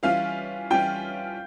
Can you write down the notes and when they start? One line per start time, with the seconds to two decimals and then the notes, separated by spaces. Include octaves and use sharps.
0.03 E3 G3 C#4 F4 F5
0.70 E3 G3 C#4 F4 G5